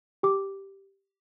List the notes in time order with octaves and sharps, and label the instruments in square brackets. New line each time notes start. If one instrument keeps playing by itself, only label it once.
[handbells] G4 D6